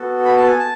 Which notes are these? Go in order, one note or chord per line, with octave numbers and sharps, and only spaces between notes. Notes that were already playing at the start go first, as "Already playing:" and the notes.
Already playing: B3 F#4 A4
B5
A5
G#5
A5